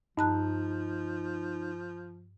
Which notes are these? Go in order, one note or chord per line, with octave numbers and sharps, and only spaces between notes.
G2 F3 D#4 A5 F#6